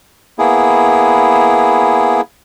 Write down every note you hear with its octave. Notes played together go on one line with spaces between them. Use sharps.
A#3 B3 E4 G#4